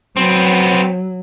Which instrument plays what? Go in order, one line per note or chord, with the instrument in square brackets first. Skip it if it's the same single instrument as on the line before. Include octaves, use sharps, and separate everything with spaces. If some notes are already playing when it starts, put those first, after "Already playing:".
[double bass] F#3 [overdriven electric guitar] B3 C4